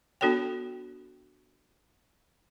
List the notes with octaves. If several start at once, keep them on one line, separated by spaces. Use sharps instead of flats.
B3 D4 F#4 A4 C#5 G5